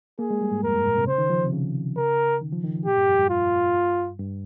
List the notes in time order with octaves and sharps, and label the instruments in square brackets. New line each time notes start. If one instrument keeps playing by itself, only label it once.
[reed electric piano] A#3 [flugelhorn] G#4
[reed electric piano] G#3
G3
G#2
[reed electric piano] F2 [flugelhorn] A#4
[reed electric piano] G2
A#2
C3
[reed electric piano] C#3 [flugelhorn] C5
[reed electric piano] D#3
F3
C3
C#3
[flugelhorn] A#4
[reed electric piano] D#3
F3
D#3
F3
[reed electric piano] A#2 [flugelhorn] G4
[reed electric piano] G2
F2
G2
[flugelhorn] F4
[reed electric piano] G2